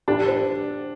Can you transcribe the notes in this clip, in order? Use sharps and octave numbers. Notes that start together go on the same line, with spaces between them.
D4 G4
C5